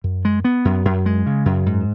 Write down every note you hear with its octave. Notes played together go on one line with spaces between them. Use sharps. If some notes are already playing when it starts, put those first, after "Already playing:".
F#2
G#3
B3
F#2
F#2
G#3
C#3
F#2
G#2